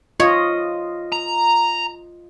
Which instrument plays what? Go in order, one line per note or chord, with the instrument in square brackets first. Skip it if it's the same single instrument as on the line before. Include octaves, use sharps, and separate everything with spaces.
[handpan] F4 D#5 [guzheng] C#5
[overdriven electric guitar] A#5